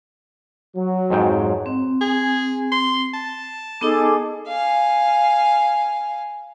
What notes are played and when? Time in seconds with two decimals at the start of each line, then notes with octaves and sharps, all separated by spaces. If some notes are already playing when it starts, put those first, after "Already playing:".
0.76 F#3
1.10 F2 G#2 G5
1.66 C4
2.01 G#4
2.72 C6
3.14 A5
3.81 B3 D#4 G#4 A4 D#5 D6
4.48 F5 G#5